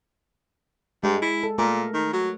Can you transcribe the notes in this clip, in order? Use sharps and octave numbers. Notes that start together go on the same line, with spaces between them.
G2 G#3
E4
A4
A#2 A3 A#4
D#3
F#3